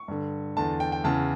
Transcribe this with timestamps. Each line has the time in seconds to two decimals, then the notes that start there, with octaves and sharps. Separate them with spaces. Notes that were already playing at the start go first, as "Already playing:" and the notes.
Already playing: C#6
0.08 G2 D3
0.57 E2 D3 A5
0.80 G5
0.92 G5
1.04 E2 C#3 E3 A5